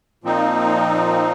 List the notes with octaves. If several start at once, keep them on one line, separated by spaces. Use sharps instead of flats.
A#2 F3 C4 D#4